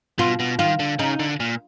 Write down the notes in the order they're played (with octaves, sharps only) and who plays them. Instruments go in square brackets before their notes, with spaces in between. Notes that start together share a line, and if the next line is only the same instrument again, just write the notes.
[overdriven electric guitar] B2 [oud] F4
[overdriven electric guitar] B2
[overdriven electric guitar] D#3 [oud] F4
[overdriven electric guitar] D3
[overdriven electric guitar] C#3 [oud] D#4
[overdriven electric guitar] D3
A#2